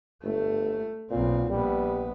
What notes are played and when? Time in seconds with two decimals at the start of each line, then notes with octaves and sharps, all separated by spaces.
0.23 G1 A3
1.11 B1 A#2 C4
1.50 A#1 G3 B3